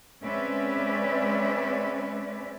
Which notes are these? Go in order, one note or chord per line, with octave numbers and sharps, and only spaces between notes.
G#3 C4 C#4 B4 D5 E5